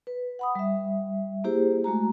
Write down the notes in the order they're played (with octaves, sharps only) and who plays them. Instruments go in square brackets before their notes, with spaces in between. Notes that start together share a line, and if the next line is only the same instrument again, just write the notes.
[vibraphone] B4
F#5 B5 D#6
G3 E5
A#3 E4 G4 G#4 C5
G#3 A3 F#4 A#5